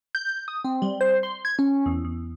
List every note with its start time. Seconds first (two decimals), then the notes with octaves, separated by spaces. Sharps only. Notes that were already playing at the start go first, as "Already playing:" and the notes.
0.15 G6
0.48 D#6
0.64 C4
0.82 G3
1.01 C5
1.23 C6
1.45 G#6
1.59 C#4
1.86 E2
2.05 E2